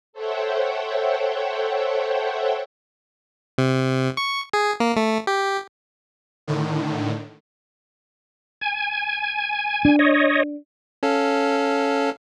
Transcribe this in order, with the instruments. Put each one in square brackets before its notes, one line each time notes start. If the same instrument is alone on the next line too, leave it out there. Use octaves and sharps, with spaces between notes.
[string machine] A4 C5 C#5 E5 F#5 G5
[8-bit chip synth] C3
C#6
G#4
A#3
A3
G4
[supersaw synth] A2 D3 D#3
[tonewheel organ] G#5
[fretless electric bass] D4
[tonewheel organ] C#5 D#5
[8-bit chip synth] C#4 A4 F5